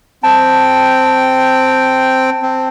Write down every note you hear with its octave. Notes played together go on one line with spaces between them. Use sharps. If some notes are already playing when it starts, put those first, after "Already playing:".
C4 G5 A5
C4